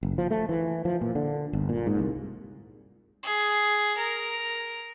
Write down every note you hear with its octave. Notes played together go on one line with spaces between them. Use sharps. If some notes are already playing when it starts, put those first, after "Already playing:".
F#1
F3
A3
E3
F3
A#2
D3
G1
A#2
G#2
C2
G#4
A#4